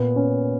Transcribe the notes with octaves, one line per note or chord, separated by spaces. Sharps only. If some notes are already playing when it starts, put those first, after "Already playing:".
Already playing: A#2 A#3 B3
C#4